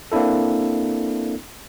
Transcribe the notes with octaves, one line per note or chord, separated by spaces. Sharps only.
A#3 C4 D4 E4 A4